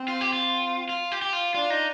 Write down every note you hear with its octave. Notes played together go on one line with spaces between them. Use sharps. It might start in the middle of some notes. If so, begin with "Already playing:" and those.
Already playing: C4
F4
G4
F4
F4
G4
G4
F4
D4 F4
D#4